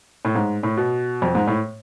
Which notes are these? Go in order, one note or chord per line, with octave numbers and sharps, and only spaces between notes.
A2
G#2
A2
B2
F2
G#2
A2